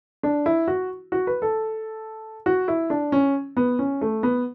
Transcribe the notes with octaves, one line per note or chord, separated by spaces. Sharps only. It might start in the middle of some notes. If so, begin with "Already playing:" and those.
D4
E4
F#4
F#4
B4
A4
F#4
E4
D4
C#4
B3
C#4
A3
B3